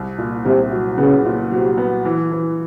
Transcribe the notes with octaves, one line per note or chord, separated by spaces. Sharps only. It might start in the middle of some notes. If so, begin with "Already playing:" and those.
Already playing: C2
A#2
C2 C3
F#3
C#3 B3
A#2
C3 F#3
B3
E3
E3